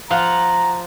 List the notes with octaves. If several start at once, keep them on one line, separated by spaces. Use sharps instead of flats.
F3 F5 F#5 A#5